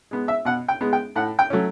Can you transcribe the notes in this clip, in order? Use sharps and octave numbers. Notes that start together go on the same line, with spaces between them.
G#3 B3
E5
B2 F#5
G5
G#3 B3
G5
A2 F#5
G5
F#3 A3 C#4